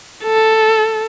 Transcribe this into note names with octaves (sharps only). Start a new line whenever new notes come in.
A4